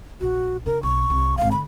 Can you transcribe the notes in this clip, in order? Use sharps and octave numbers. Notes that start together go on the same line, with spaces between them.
A#1 F#4
C#3 D4 A#4
B1 C#6
C2
G#1 A#3 F5
D3 B5